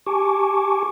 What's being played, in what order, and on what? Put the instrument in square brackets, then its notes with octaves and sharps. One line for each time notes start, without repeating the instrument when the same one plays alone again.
[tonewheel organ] G4 G#5 A5 C#6 D6